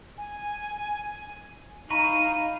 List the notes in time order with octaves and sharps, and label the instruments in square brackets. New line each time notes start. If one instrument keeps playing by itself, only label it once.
[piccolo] G#5
[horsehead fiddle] D#4 F5 [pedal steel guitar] A#5 B5 C#6 [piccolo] D#7